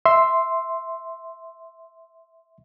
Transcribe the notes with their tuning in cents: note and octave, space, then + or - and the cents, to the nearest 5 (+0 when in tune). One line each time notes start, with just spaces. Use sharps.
E5 +0 C6 -5